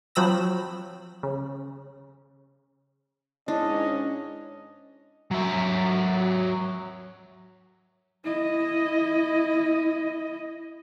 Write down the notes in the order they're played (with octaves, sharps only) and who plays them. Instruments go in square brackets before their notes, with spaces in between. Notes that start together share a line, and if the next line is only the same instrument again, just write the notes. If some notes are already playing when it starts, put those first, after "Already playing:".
[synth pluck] F3 F#3 C4 B5 E6 A#6
C#3
[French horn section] G#2 C#4 [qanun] D4 [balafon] E4 [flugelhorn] D#5
[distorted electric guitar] F#3 E5
[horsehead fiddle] E4 D#5